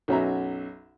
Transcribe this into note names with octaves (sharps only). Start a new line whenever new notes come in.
B1 F#2 C#4 F#4 E5 A#5